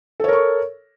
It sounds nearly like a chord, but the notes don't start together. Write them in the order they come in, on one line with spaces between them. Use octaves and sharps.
A4 C#5 A#4 C#6